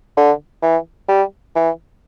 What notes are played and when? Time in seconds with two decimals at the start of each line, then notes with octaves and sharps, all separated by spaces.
0.17 D3
0.62 E3
1.08 G3
1.55 E3